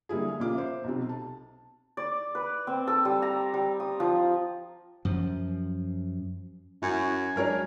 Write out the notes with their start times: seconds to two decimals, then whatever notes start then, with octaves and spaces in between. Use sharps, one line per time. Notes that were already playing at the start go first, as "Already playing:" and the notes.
0.09 D3 G3 A#3 E4 G#4
0.40 A#2 C#3 F4 D6
0.54 C5 E5
0.84 B1 C3
1.09 A5
1.97 D5
2.35 B4
2.67 C4
2.87 A4
3.05 G3
3.22 A#5
3.54 G3
3.80 D#6
4.00 F3
5.05 F#2 F3
6.82 F#2 E4 G#5
7.36 F#3 G#3 D4 F#4 A#4 C#5